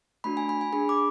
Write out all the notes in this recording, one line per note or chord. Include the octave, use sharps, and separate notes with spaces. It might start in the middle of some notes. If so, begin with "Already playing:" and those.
A3 D4 F#4 B5
G#5
B5
G#5
D4 G#4 B5
D6